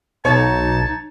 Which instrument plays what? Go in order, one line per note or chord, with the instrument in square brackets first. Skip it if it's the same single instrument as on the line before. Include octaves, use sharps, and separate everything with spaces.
[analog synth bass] B1 [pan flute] D#4 [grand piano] C#5 [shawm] A5